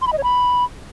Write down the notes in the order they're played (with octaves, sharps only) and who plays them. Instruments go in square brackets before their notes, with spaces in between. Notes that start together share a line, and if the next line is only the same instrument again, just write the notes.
[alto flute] C6
B5
D#5
C#5
B5